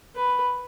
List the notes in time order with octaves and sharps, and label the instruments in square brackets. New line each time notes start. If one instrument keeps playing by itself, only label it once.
[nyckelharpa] B4